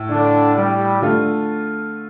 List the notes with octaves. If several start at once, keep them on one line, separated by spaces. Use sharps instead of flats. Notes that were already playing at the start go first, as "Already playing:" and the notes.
Already playing: A2
D3 D4
G3
D3 A3 F4